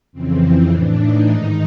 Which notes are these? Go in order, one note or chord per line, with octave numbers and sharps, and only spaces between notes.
F2 C#3 E3 C4
C4
A2 E3 D4
D#4
G#2 D#3 D#4